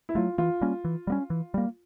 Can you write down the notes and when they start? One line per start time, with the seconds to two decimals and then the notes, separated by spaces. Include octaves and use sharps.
0.09 E4
0.15 F#3 A3 F4
0.38 E3 F4
0.61 G3 A#3 C#4
0.85 E3
1.07 G3 A#3 C#4
1.30 E3
1.54 G3 A#3